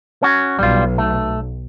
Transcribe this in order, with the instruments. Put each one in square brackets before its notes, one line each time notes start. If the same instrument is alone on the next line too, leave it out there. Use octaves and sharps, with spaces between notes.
[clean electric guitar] C#4 F#4
[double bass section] B1 [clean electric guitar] G3 F4
[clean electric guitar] A3